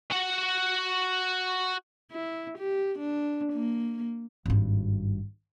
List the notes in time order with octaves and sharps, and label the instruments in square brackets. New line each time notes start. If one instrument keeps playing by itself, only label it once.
[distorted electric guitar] F#4 F#5
[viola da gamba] E4
G4
D4
A#3
[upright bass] G#1 G2